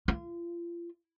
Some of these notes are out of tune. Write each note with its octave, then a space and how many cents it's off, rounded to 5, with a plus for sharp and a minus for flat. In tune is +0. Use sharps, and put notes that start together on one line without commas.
F4 -35